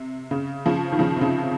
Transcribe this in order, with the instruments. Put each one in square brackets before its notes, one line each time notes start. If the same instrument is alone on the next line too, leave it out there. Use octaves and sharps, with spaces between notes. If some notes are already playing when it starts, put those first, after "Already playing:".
Already playing: [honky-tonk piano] C3
C#3
C#3 F3
D#3
C#3 F3
C3
C#3